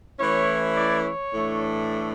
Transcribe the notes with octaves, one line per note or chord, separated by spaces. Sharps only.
E3 A3 C#4 E4 C#5
D5
C#5
A2 E3 A3 D4